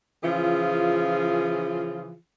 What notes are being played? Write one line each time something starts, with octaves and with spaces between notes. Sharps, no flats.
C#3 E3 F3 F4 G#4